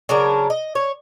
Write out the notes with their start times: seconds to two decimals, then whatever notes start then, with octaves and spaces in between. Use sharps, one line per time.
0.09 C#3 F#3 D4 A#4
0.50 D#5
0.75 C#5